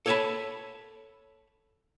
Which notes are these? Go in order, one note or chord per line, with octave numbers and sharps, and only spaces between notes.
A4 C#5 D5 G#5 A5 B5